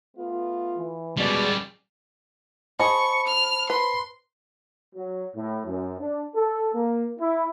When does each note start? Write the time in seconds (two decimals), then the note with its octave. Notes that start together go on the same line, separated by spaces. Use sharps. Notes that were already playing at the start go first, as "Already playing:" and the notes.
0.17 A3 B3 F4
0.78 E3
1.17 B2 G3 G#3 C#4 D5
2.80 G#4 C5 D#5 A5 B5 C#6
3.27 F6
3.70 B4 C6
4.95 F#3
5.36 A2
5.66 F#2
6.01 D4
6.36 A4
6.74 A#3
7.20 E4